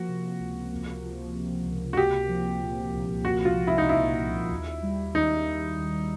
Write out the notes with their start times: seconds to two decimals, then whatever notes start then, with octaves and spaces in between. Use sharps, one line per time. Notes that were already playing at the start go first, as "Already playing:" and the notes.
Already playing: F3 A#3 F#4
0.09 C3
0.40 C#2
0.71 A#3
1.03 F3
1.35 C3
1.66 C#2
1.93 F#4
1.97 A#3 G4
2.29 F3
2.61 A#2
2.93 C2
3.25 A#3 F#4
3.45 F4
3.57 F3
3.67 E4
3.78 D#4
3.88 A#2 E4
4.19 C2
4.51 D#2
4.83 G3
5.14 D#3 D#4
5.46 D#2
5.78 D#2